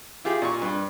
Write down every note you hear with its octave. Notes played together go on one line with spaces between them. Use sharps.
E4 F4 G4 G#4
A#2 C#6
G2